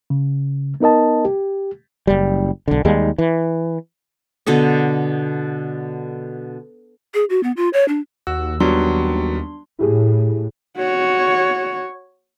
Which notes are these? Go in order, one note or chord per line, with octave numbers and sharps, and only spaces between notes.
C#3
B3 D#4 A#4 D#5 A5
G4
F#1 G3
B1 D3
D#2 G3 G#3
E3
B2 D3 A4 D#5
G#4
F#4
B3
F4
C#5
D4
D#2 F#4 E6
F#3 G3 B3 D4 C6
A2 E4 G4 G#4
F#4 C#5